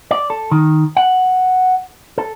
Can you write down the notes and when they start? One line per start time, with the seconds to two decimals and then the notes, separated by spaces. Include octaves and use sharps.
0.11 D5
0.30 A4
0.51 D#3
0.97 F#5
2.18 A4